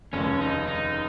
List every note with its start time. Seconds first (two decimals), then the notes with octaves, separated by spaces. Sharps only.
0.13 F1 D#2 C#3 G#3 C#4
0.41 D#4
0.67 D#4